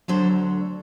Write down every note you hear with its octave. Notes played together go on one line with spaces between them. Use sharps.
D2 D3 F#3 A4 C5